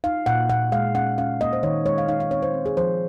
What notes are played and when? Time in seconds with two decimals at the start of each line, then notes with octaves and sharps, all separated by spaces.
0.04 D#4 F5
0.26 A#2 F#5
0.50 A#2 F#5
0.72 G#3 F5
0.95 C#4 F#5
1.18 C#4 F5
1.41 A#3 D#5
1.53 C5
1.63 D#3 C#5
1.86 G#3 C#5
1.98 F5
2.08 D#4 F5
2.20 F5
2.31 C4 C#5
2.43 C5
2.54 C4
2.66 G#4
2.77 F3 C5